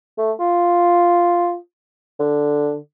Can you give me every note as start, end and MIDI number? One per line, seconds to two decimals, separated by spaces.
0.18 0.32 57
0.39 1.56 65
2.19 2.76 50